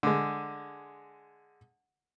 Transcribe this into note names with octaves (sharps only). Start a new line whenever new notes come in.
D3 G#3